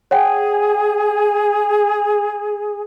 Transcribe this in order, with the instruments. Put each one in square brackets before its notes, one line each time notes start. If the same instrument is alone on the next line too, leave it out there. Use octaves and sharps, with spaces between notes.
[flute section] G#4 [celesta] C#5 F#5 G5